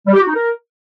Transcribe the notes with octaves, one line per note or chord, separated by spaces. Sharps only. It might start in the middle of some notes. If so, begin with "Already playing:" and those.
G3
G4
F#4
D#4
A#4